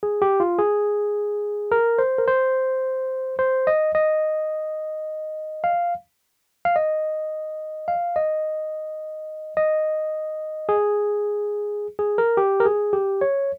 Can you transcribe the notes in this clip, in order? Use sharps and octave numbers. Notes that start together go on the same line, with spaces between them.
G#4
G4
F4
G#4
A#4
C5
A#4
C5
C5
D#5
D#5
F5
F5
D#5
F5
D#5
D#5
G#4
G#4
A#4
G4
A#4
G#4
G4
C#5